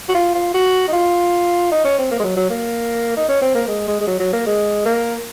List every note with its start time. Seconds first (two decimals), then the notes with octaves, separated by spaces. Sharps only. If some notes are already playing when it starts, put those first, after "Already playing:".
0.09 F#4
0.15 F4
0.35 F4
0.54 F#4
0.88 D#4
0.93 F4
1.72 D#4
1.85 C#4
1.98 C4
2.11 A#3
2.20 G#3
2.24 F#3
2.37 F#3
2.50 A#3
3.17 D#4
3.29 C#4
3.42 C4
3.55 A#3
3.68 G#3
3.88 G#3
4.01 G#3
4.07 F#3
4.20 F#3
4.33 A#3
4.47 G#3
4.86 A#3